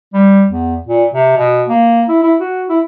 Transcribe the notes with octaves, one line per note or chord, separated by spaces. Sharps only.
G3
E2
A#2
C3
B2
A#3
E4
E4
F#4
E4